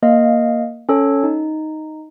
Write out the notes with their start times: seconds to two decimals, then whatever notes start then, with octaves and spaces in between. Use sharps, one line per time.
0.02 A#3 D#5 F5
0.89 C#4 A4 C#5
1.23 D#4